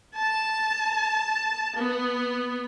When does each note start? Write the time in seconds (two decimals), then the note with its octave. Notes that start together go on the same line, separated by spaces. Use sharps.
0.15 A5
1.75 B3